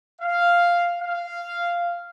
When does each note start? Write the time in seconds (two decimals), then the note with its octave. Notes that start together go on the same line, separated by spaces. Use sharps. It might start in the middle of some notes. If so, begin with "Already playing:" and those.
0.21 F5
1.01 F5